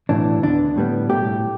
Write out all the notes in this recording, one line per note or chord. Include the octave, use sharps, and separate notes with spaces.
B1 A2 E3 D4
D2 D3 B3 D4
A2 G3 B3
B1 A2 A3 G4